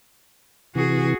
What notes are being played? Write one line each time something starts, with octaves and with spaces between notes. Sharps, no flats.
C3 E3 F#4 G#4